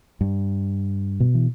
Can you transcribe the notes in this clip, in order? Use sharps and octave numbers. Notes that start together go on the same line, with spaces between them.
G2
B2
E3